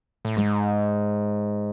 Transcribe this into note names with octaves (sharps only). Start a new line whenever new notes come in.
A2
G#2 G#3